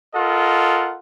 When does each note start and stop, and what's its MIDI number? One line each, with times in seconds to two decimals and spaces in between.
0.15 0.98 65
0.15 0.98 69
0.15 0.98 70
0.15 0.98 75
0.15 0.98 78